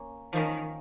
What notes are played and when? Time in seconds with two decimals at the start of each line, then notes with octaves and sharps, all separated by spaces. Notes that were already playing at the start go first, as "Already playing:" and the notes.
Already playing: A#3 C#4
0.33 D#3 F3 A#3 C#4